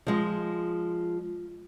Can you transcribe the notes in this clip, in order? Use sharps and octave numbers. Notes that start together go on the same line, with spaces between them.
F3 G#3